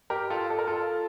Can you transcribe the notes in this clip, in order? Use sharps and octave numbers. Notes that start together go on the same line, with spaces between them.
G4 A#4
F4 A4
A4
A#4
F4 A4